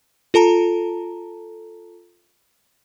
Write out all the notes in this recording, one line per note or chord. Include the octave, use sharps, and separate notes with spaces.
F4 A4 A5 A#5